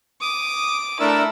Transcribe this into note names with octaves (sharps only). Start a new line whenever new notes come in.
D6 D#6
A3 D4 E4 A#4 E6